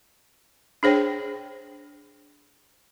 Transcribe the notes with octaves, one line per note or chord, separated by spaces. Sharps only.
D4 G#4 C5 C#5 G5